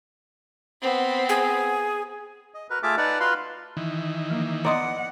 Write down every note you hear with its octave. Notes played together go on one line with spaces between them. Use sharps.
B3 C4
G#4
D#5
F#4 A#4 B4
A3 F4 G#4 E5 A5 D6
D#4 B4 D5 F#5 A5
F4 F#4 B4 F5 B5 C6
D#3 E3
F3 A#3
B3 D5 D#5 F#5 A#5 C6 D#6